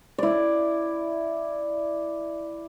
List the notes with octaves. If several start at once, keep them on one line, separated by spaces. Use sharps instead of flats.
E4 D5